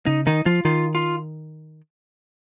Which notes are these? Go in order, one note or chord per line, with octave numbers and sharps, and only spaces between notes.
C#3 D#4
D#3 D#4
F3 F4
D#3 F4
F4